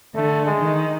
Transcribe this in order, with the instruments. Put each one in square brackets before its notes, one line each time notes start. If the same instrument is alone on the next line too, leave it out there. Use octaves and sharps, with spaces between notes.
[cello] D3 [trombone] A3
[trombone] G#3
[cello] D#3